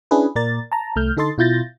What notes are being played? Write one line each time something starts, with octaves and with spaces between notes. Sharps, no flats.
C#4 D4 E4 G#4 B4
A#2 A#3 A#4 D5 A6
A5 A#5
C2 A3 F6 G6
D3 D#4 A4 D#5 C6 A6
B2 E4 F4 G6 A6 A#6